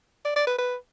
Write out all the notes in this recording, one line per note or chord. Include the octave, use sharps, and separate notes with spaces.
D5
D5
B4
B4